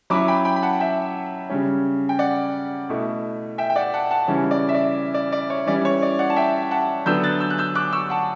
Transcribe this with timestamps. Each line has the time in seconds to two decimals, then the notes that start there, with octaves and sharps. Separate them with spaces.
0.10 F#3 C#4 E4 B5 D6
0.28 G5 B5
0.45 G5 B5
0.56 B5
0.62 F#5 A5
0.80 E5 G5
1.50 C#3 G3 C#4
2.09 G5
2.19 D5 F#5
2.89 B2 A3 E4
3.58 E5 G5
3.70 G5
3.76 D5 F#5
3.94 F#5 A5
4.11 F#5 A5
4.28 C#3 E3 G3 C#4
4.51 D5
4.69 E5
4.74 D5
5.14 D5
5.32 D5
5.50 C#5
5.66 E3 G3 C#4 E4 D5
5.85 C#5
6.02 D5
6.19 D5 F#5
6.30 A5
6.36 E5 G5
6.71 F#5 A5
7.06 D3 F#3 B3 D4 E6 G6
7.23 F#6 A6
7.40 E6 G6
7.50 F#6
7.58 E6 G6
7.75 D6 F#6
7.93 C#6 E6
8.10 F#5 A5